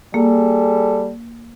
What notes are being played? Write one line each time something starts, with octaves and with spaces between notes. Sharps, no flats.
G3 A#3 G#4 A4